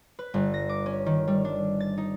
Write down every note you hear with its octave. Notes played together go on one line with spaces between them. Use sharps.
B4
G1
A#6
D6
C#4
D#3
G3
D4
A6
D#4